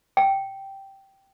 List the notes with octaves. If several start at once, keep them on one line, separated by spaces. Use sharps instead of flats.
G5